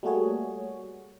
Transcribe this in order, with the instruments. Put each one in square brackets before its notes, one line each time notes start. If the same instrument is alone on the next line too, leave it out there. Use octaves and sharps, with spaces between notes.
[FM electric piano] G3 A3 A#3 F#4 G#4 C#5